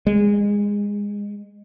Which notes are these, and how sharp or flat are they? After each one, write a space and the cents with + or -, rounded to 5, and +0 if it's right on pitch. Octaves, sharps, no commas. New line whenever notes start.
G#3 -20